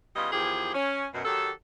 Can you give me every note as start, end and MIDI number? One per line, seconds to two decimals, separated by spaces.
0.16 0.31 49
0.16 0.31 55
0.16 0.31 59
0.16 0.31 64
0.16 0.31 65
0.16 0.31 75
0.32 0.72 40
0.32 0.72 51
0.32 0.72 53
0.32 0.72 64
0.32 0.72 67
0.32 0.72 68
0.74 1.07 61
1.13 1.23 42
1.13 1.23 47
1.25 1.51 51
1.25 1.51 54
1.25 1.51 67
1.25 1.51 69